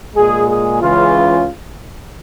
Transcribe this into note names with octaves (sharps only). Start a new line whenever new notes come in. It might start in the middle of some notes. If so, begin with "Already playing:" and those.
A#2 G#3 G#4
G#4
C#2 C#3 E3 F4